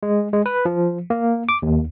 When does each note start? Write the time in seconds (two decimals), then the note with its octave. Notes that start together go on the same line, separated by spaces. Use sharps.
0.03 G#3
0.33 G#3
0.46 B4
0.65 F3
1.10 A#3
1.49 D6
1.62 D#2